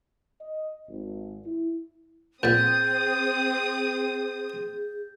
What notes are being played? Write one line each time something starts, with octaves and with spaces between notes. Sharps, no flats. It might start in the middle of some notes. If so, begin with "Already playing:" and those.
D#5
G#1
E4
A#2 B3 C4 G#4 D#6 G6 A6